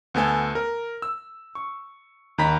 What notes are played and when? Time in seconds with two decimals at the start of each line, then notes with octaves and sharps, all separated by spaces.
0.14 D2 B3 A4 G#5
0.55 A#4
1.02 E6
1.55 C#6
2.38 D#2 D#3 A#5 B5 B6